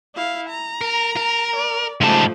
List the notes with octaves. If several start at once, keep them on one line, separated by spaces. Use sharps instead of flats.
E4 F5
A#5
A#4
A#4
D5
G#2 C#3 F3 G3 A3 A5